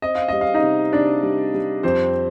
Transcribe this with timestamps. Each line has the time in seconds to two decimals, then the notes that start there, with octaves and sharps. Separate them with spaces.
0.02 C4 D#5
0.15 F5
0.28 G3 D#5
0.41 F5
0.54 D#4 D#5
0.63 C3
0.93 C3 D4 D5
1.23 G3
1.54 G3
1.83 F2 C4 C5